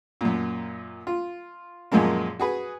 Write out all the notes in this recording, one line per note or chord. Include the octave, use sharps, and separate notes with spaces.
F#2 A#2
F4
F#2 A#2 F3 G#3 A#3
F#4 G#4 B4 G#5